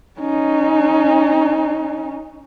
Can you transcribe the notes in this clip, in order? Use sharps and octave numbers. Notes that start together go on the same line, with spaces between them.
C#4 D#4